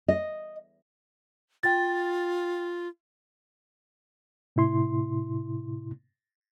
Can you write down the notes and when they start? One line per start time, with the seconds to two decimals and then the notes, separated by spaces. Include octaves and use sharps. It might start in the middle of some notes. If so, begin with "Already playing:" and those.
0.08 D#5
1.63 F4 G5 A6
4.56 A2 C3 E4 C6